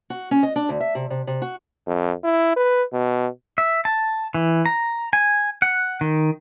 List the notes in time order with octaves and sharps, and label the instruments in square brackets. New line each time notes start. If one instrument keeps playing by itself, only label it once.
[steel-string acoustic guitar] F#4
C#4
D#5
D4
D2
E5
C3
C3
C3
F#4
[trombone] F2
E4
B4
B2
[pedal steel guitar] E5
A5
E3
A#5
G#5
F#5
D#3